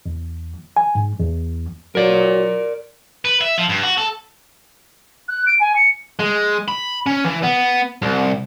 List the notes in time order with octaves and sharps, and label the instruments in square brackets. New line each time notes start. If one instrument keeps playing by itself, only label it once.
[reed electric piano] E2
G#5
G#2
E2
[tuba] F#3 [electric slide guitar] A#4 D5
[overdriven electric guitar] B4
E5
F3
G2
F#4
A4
[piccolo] F#6
D7
G#5
C#7
[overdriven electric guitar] G#3
B5
C#4
E3
B3
C2